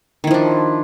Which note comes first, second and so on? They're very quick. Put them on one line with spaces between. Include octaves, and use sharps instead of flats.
D#3 E4 F3 D4